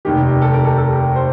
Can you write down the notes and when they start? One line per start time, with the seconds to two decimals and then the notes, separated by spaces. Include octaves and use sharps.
0.05 F1 D#2 D#3 G4
0.42 A4
0.54 A#4
0.65 A4
0.78 A4
1.15 C5